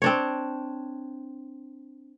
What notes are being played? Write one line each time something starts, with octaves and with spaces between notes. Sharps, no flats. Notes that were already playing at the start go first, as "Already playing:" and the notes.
C4 D4 C#5